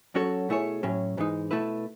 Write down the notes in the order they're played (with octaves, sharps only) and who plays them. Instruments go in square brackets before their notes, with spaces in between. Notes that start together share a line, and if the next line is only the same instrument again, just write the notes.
[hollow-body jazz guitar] F#3 C#4 F#4 A4 C#5
B2 A3 E4 G#4 C#5
A2 F#3 C#4
G#2 E3 G#3 D#4
B2 A3 E4 B4